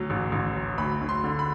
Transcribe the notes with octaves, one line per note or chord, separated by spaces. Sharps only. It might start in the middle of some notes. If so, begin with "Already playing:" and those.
Already playing: D2 F#3
A1
A1
F#3
D2 B5
D2
C6
D3
B5